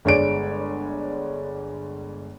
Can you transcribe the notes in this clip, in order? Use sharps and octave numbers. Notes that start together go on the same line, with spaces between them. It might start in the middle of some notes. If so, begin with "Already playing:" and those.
G1 G#3 C#5 D5 D7